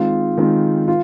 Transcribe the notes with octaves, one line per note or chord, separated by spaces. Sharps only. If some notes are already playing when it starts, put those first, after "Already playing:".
Already playing: D#3 G#3 C4 F4
D#3 G#3 C4 F4
F4